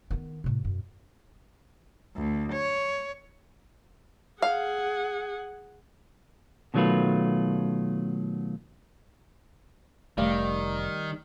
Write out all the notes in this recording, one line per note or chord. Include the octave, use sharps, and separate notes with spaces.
D#3 B3
A2 C3
F#2 B2
D2
C#5
G#4 F5 F#5
B2 D#3 F#3 A3 F4 B4
F1 D#3 G3 A3